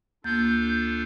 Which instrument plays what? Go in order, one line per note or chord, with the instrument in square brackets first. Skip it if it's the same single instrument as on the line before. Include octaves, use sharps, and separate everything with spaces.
[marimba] D2 A#3 A6 [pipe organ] D4 F4 A4 [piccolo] G6